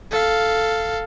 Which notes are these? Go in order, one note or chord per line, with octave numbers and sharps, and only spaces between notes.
A4 F5